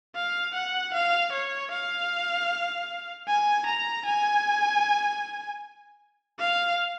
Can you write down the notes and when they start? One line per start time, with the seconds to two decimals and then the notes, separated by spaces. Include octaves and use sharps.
0.16 F5
0.54 F#5
0.94 F5
1.33 C#5
1.71 F5
3.28 G#5
3.66 A#5
4.06 G#5
6.40 F5